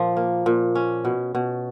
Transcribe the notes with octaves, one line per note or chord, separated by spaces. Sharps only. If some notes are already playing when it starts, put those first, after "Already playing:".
Already playing: A#2 F3
A#3
A#2
C#4
B2
B2